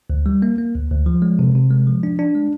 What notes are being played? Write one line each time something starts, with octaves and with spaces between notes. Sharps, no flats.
D2
G3
A#3
A#3
D2
D2
F3
G#3
C3
C3
G#3
F3
D4
D4
G#3